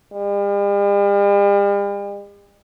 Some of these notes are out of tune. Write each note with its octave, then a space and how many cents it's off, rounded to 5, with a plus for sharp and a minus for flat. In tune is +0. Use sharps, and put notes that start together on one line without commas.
G3 +45